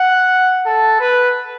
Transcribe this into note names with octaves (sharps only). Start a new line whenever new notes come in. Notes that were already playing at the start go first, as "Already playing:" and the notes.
Already playing: F#5
A4
B4